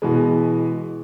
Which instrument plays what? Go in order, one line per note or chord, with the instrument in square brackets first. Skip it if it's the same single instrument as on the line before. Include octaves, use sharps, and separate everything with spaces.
[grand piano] B2 E3 G#3